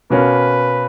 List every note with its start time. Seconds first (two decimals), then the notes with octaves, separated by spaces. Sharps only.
0.10 B2 A#3 C#4 B4